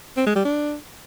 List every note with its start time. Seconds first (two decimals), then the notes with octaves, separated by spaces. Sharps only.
0.17 C4
0.26 G#3
0.36 G3
0.45 D4